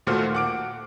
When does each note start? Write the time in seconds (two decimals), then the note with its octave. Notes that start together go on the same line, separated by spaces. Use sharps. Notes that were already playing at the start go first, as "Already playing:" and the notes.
0.07 D#2 A#2 A3 F#4 C5 F6
0.35 F#5 D6 D7